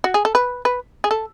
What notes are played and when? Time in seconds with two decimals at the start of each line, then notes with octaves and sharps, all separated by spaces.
0.04 F#4
0.14 G#4
0.25 A4
0.35 B4
0.65 B4
1.04 G#4
1.11 A4